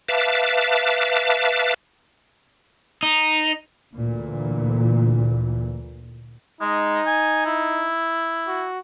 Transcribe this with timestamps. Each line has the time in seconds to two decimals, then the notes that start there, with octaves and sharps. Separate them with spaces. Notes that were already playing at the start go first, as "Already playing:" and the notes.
0.09 B4 E5 F5 A5 D6
3.03 D#4
3.96 D2 A#2 E3
6.61 G#3 D#4
7.06 G#5
7.46 E4
8.47 F#4